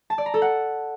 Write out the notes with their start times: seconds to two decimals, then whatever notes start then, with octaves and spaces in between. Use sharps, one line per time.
0.10 A5
0.18 D5
0.26 A#5
0.34 A4
0.42 F#5